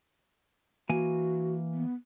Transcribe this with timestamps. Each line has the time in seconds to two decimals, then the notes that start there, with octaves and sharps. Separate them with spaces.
0.89 E3 A#3 F#4 G#5
1.74 B3